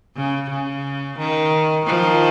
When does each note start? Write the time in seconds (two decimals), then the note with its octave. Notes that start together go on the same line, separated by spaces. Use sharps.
0.16 C#3
0.50 C#3
1.18 D#3
1.85 D#3 F3